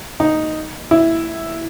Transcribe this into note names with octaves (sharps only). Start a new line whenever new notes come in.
D#4
E4